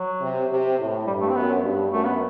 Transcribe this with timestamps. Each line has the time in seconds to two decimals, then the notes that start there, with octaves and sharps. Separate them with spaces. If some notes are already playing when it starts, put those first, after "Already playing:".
Already playing: F#3
0.21 C3
0.49 C3
0.78 A2
1.07 G2 G3
1.21 A3
1.28 C4
1.35 F#2 B3
1.63 G2
1.92 F#2 A3
2.04 B3